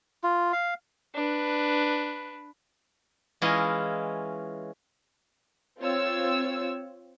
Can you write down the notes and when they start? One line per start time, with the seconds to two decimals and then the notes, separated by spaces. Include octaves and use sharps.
0.23 F4
0.53 F5
1.15 D4 B4
3.42 E3 G#3 C#4 E4 F4 D#5
5.80 C4 F4 C#5 E6